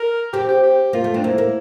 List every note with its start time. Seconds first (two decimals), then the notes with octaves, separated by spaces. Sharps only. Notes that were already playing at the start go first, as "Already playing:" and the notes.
Already playing: A#4
0.33 C4 G4
0.49 G4
0.63 G4
0.93 A#3 F4
1.04 A3
1.14 C4 D4
1.24 A#3 E4
1.38 A#3